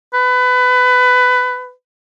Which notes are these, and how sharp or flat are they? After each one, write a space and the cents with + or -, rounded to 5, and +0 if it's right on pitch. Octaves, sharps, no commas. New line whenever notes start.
B4 +20